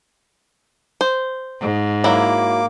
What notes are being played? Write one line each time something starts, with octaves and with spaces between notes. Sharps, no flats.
C5
G#2
F#3 A#3 E4 D6